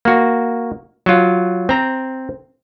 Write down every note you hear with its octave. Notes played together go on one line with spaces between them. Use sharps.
A#3 F#4
F#3 F4
C4 A#5